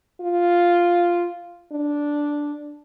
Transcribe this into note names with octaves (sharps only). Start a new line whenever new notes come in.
F4
D4